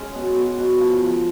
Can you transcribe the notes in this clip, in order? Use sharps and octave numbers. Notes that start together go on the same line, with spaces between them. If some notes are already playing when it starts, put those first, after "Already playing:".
Already playing: G#3 C#4
B2
B2
B2
F3
F3